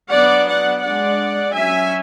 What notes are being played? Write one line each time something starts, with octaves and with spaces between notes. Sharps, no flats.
F#3 B3 D4 D5 F#5
D5 F#5
G#3 D4 D5 F#5
F#3 C#4 E5 G#5